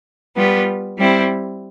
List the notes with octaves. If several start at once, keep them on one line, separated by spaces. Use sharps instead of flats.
G3 B3 F4
G3 C4 E4